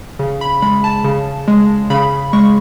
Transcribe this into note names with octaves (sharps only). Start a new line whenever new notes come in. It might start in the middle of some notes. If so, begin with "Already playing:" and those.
C#3
B5
G#3 B5
A5
C#3
G#3
C#3 B5
G#3 C#6